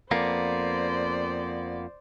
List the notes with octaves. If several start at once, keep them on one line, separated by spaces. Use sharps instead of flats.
F2 A#3 B3 C5 D5